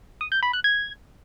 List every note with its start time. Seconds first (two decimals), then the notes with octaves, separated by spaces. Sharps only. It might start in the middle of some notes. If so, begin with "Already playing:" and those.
0.21 D#6
0.32 G6
0.43 B5
0.53 F#6
0.64 G#6